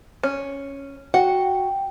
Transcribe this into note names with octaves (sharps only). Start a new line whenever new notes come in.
C#4
F#4 F#5 G5